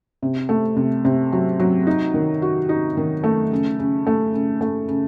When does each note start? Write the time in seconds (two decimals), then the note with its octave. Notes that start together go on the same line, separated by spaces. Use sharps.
0.22 C3
0.49 A3
0.76 C3
1.05 C3
1.32 F#3
1.60 F#3
1.87 D#4
2.14 D#3
2.42 F#4
2.69 D#4
2.97 D#3
3.24 A3
3.52 C#3
3.79 C#3
4.07 A3
4.34 C#3
4.61 A3
4.88 C#3